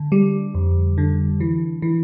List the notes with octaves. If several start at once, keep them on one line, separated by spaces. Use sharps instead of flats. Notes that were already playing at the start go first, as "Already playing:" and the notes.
Already playing: D3
G3
F2
D3
E3
E3